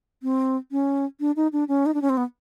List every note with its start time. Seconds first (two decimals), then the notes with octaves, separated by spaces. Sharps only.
0.23 C4
0.71 C#4
1.20 D4
1.36 D#4
1.53 D4
1.68 C#4
1.86 D#4
1.94 D4
2.02 C#4
2.10 C4
2.17 B3